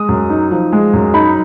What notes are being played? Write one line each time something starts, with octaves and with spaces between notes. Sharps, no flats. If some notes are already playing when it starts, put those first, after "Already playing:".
Already playing: G#3 D#6
F#2
D#4
F3
G#3
F#2
D#4 B5